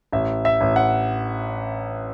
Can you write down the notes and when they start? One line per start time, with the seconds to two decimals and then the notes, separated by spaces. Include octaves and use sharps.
0.13 A1 E5
0.45 E5
0.61 A1
0.76 F#5